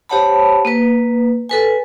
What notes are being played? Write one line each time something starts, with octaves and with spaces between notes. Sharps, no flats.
G4 C5 C#5 F#5 A5 B5
A#3 B4
A4 B4 G#5